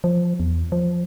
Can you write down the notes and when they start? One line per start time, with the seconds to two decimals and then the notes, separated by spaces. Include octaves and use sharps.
0.04 F3
0.40 E2
0.72 F3